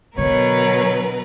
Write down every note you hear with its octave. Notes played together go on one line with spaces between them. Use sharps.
B2 D3 F#3 A#4 B4 C#5